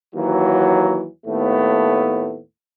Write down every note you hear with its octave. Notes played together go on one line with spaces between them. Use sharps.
D#2 E3 F#3
D#2 A2 A3 B3